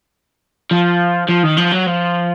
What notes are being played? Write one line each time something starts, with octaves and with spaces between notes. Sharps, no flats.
F3
F3
D#3
F3
F#3
F3